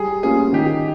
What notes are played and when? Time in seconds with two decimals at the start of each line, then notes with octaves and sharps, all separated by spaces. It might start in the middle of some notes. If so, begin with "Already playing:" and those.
Already playing: G3 G#4
0.23 A#3 C#4 F4 G#4
0.53 D#3 G4